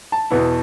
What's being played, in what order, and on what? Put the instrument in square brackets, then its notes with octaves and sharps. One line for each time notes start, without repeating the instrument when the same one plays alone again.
[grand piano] A5
E2 B2 B3 E4